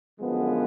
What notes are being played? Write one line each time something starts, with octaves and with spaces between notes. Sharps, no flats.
F#2 D3 F3 G#3 B3